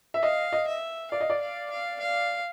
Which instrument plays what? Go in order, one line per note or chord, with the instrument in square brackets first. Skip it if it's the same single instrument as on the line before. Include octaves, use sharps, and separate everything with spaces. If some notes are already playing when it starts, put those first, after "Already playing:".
[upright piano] E5
[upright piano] D#5 [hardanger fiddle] F5
[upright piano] D#5
[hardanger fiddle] E5
[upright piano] D5 [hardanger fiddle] F5
[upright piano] D#5
D5
[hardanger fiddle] F5
F5
F5